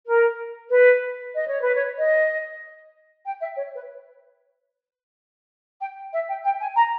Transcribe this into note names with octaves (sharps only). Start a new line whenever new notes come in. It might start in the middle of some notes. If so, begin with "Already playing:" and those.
A#4
B4
D#5
C#5
B4
C#5
D#5
G5
E5
C#5
B4
G5
E5
G5
G5
G#5
A#5